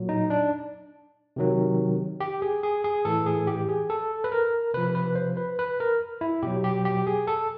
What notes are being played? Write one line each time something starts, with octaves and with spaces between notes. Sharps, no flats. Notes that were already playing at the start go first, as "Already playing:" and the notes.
Already playing: A#2 F#3
D#4
D4
C3 D#3 F#3
G4
G#4
G#4
G#4
A2 E3 A4
G#4
G4
G#4
A4
B4
A#4
C3 F3 B4
B4
C5
B4
B4
A#4
E4
B2 F#3 G4
G4
G4
G#4
A4